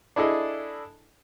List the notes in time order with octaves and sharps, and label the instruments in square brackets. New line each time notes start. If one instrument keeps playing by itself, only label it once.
[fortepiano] D4 E4 G#4 A4 D#5